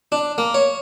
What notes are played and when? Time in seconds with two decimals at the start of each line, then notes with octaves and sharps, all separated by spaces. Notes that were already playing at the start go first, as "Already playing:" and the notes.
0.12 D4
0.38 A#3
0.54 C#5